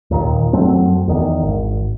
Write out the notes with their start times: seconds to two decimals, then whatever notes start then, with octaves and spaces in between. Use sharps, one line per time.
0.11 D#2 A#2 D#3
0.53 F#2 F#3 A3 C4
1.07 E2 D#3
1.42 G#1